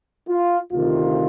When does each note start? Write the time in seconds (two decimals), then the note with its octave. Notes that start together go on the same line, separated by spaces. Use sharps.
0.28 F4
0.72 D2 C3 D#3 F4